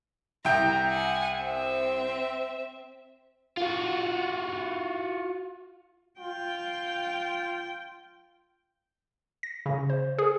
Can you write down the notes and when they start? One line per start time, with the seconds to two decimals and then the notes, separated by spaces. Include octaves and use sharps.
0.45 C2 G5 A#5 G6
0.90 F#5 G#5
1.42 C4 E5
3.57 F4 F#4
6.20 F4 G5
9.43 A#6
9.66 C#3
9.90 C5
10.18 G#4